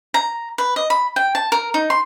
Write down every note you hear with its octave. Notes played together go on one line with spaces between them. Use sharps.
A#5
B4
D#5
B5
G5
A5
A#4
D#4
C6